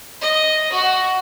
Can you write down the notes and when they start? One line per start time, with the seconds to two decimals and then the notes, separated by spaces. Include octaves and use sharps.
0.22 D#5
0.72 F#4